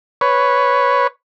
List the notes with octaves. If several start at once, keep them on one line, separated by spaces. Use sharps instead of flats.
B4 C#5